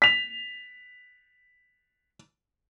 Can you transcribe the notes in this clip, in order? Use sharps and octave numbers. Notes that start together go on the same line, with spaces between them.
B6 F7